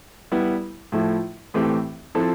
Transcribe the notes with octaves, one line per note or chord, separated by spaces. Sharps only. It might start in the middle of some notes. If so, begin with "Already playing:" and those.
G3 B3 E4
A2 F3 A3 E4
A2 E3 A3 C4 G4
F3 C4 E4 A4